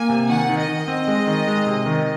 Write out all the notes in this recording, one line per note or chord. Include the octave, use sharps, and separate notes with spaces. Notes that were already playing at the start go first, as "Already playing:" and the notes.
Already playing: A#3 G#5
C3
D#3 F#5
D#3
D#5
D#3
C4
G#3
D#3
G#3
C3
D#3